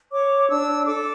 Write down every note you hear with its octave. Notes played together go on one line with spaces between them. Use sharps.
C#5 D6
D4 E6
A4 D6